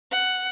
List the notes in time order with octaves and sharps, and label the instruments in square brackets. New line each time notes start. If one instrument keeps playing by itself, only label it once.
[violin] F#5